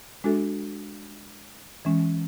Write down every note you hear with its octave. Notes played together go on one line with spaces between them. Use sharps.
G#3 D4 F#4 A4 E5
E3 G#3 C#4